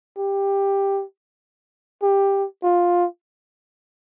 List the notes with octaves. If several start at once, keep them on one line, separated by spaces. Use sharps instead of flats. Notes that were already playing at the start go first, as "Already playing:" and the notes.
G4
G4
F4